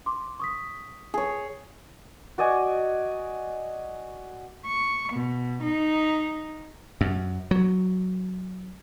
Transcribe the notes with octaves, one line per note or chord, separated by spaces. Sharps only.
C6 D6
C#6 D#6 B6
G#4 C#5
F#4 D5 D#5 G#5
C#6
B2
D#4
F#2
F#3